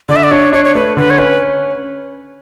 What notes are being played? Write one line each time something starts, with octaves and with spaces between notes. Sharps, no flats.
D3 D5
E5
D5
D4 C#5
D4 C#5
C#5
A3 B4
D3 B4
C#5
C#4 B4